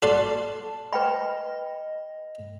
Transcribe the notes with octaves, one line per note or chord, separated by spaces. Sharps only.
F#4 A4 D5 A5 C6
B4 D#5 G5 B5